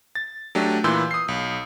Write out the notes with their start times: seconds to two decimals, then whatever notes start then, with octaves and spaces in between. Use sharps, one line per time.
0.15 A6
0.55 F#3 A3 D4 G4
0.84 A#2 E3 B4 C6 E6 G6
1.11 D#6 C7
1.28 B1